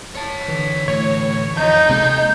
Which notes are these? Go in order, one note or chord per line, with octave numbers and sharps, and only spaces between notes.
C#5 A5
D3 E3
A2 A3 C#5
F2 D#4 G6
C3 G#3 A#3 A4 D#5